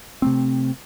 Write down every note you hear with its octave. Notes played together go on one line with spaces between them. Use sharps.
C3 A3 C4